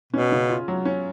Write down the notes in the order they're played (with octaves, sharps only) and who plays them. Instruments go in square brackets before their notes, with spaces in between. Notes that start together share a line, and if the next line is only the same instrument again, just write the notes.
[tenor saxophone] B2 [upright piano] C#4
[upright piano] C#3
F4
F#3
C#4